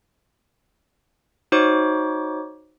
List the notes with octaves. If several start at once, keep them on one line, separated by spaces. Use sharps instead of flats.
D#4 F#4 C5 C#5 D6